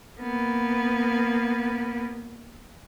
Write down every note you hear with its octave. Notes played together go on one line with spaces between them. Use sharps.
A#3 B3